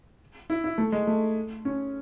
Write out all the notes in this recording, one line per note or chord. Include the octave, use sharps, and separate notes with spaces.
E4
E4
A3
G#3
A3
C#4